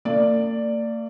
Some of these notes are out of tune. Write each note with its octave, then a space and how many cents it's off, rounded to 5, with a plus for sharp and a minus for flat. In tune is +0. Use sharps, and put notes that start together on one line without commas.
A#3 -45 D5 +0